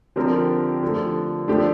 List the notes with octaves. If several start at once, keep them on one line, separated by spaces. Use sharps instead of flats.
D3 F3 C4 G4 A#4
D3 F3 A3
F3 A3 D4 G4